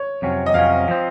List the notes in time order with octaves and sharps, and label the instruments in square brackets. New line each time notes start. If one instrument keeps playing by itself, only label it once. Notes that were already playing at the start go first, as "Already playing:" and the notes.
Already playing: [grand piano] C#5
[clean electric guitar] F2 C3 F#3 C#4
[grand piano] D#5
[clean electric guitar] F2 C3 F#3 C#4 [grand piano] F5
[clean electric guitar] F3 C4